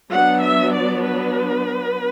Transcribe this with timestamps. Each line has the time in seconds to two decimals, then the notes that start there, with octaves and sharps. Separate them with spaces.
0.11 F#3 B3 D4 F#5
0.43 E5
0.73 D5
1.04 B4